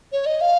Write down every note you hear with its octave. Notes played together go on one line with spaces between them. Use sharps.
C#5
D#5
F5